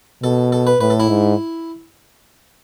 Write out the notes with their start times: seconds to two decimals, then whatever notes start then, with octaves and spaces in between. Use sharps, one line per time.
0.23 B2 A4
0.52 A4
0.67 B4
0.80 A2 B4
0.90 A4
1.00 E4
1.09 G#2